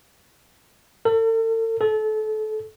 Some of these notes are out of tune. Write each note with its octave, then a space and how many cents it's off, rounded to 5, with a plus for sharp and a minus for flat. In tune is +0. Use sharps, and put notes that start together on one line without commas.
A4 +40
A4 -30